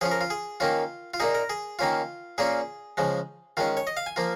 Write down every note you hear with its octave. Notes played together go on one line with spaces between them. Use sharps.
F3 C#4 F4 G#4
A#4
F4
G#4
D#3 A#3 C#4 F4
F4
A#2 A#3 D#4 G#4
A#4
G#4
D#3 A#3 C#4 F4
A#2 A#3 C#4 F4 G#4
C#3 F3 G#3
D#3 G#3 C#4 F4
C#5
D#5
F5
G#5
F3 A#3 F4